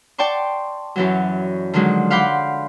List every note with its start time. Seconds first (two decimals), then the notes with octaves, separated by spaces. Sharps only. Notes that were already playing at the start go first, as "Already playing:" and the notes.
0.18 D5 G5 A5 C6 C#6
0.96 F#2 E3 F#3
1.73 D3 D#3 F3 F#3 G#3
2.10 F5 F#5 B5 C6 D6 G6